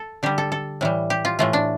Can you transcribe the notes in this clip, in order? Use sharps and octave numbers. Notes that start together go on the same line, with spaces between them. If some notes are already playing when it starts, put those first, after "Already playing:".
Already playing: A4
D3 G3 G4
A4
A4
A2 E3 G3
G4
F4
A2 E3 A3 F4
D4